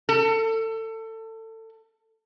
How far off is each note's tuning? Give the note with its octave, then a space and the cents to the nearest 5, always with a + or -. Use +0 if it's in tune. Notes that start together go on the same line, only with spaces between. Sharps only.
A4 +25